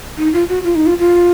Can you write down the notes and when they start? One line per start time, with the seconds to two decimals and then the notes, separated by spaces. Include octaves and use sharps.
0.18 D#4
0.33 F4
0.49 F#4
0.64 F4
0.76 D#4
0.86 F4
0.99 F4